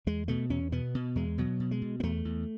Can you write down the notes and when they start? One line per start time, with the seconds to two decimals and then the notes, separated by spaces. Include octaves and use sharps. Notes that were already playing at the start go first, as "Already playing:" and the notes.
0.07 E2 G#3
0.28 B2 A3
0.50 E2 C#4
0.72 B2 B3
0.95 B2
1.15 E2 G#3
1.38 B2 F#3
1.60 B2
1.71 G#3
1.82 B2
2.00 B3
2.03 E2 A3
2.25 E2